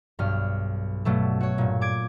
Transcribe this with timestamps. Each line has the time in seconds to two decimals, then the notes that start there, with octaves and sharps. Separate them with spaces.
0.19 B1 G2 F6
1.05 G2 B2 F#3 A3
1.41 F#4 C#5
1.58 G2 A#2
1.81 D6 G#6 D7